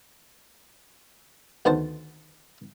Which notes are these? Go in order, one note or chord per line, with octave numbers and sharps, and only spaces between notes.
D2 D#3 B3 C5 A5